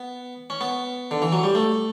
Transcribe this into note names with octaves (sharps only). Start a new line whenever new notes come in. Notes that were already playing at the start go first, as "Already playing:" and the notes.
Already playing: B3
C#4
B3
D3
E3
F#3
G3
A3